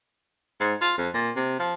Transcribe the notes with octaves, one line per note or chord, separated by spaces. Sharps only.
G#2
F4
F2
A#2
C3
F3